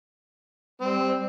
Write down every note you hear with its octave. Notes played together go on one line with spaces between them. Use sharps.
G3 C4